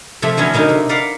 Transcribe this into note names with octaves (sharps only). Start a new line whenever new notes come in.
C3 F3 A3
D3 F#3 B3 C#4 E4
B2 D3 D#4 A#4 D#5
C3
A#4 B4 D5 F5 F#5